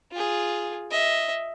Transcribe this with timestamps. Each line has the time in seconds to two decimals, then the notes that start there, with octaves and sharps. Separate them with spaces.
0.12 F4 G#4
0.91 D#5 E5